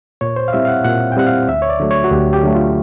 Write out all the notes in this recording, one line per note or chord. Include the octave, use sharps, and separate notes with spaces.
A#2 C#5
C5
F5
G3 C4 E4 E5
F5
F#5
A#2 F#5
G5
G3 C4 E4 F#5
F5
D2 E5
C#5
D5
D3 F#3 A3
C#5
F#4
D2 G4
G4
D3 F#3 A3
F4